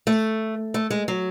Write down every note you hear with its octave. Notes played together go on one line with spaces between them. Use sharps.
A3
A3
G#3
F#3